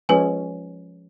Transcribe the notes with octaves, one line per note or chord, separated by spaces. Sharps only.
F3 G#3 C#4 B4 G#5